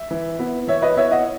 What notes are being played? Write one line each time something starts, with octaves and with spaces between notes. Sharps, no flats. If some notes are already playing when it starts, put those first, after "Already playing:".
Already playing: E5
E3
B3 E4
E3 C#5 E5
B4 D#5
B3 E4 C#5 E5
D#5 F#5